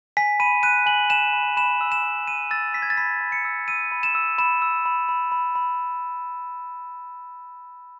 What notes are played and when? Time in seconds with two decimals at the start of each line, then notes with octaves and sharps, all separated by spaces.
0.17 G#5 B6
0.40 B5 D#7
0.63 F#6 D#7
0.86 G#5 F#7
1.10 G#5 E7
1.33 B5
1.57 B5 E7
1.81 E6
1.92 E7
2.03 B5
2.27 B5 D#7
2.51 E6 A6
2.74 E6 B6
2.82 G#6
2.90 A6
2.97 B5 B6
3.21 B5
3.32 C#7
3.45 E6
3.68 E6 D#7
3.92 B5
4.03 E7
4.15 E6
4.38 B5 E7
4.62 E6
4.86 B5
5.09 B5
5.32 B5
5.55 B5